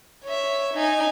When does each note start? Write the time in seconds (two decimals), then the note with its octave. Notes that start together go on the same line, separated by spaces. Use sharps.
0.25 C#5 E5
0.74 D#4 G#5